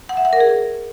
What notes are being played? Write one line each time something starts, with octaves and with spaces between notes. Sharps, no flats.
F#5
E5
F#5
A#4
G#4